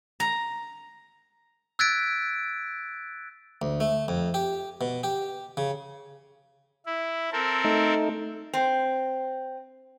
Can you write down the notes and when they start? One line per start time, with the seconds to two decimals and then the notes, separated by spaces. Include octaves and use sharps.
0.20 A#5
1.79 E6 F#6 G#6 A6 B6 D7
3.62 D2
3.80 A3
4.08 F2
4.34 G4
4.81 B2
5.03 G4
5.57 C#3
6.86 E4
7.32 C4 A4 A#4
7.65 A3 D#4
8.54 C4